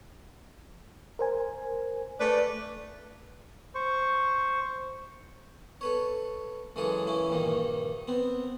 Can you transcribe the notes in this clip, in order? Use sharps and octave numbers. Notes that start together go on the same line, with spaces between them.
A#4 C5 G#5
A3 B4 D5
C5 C#6
A4 B4 C#5
F#2 C#3 E3 G#3 G#4 A4
E3 C#4 E4
A#1 G2 D#3 A#3
B3 C4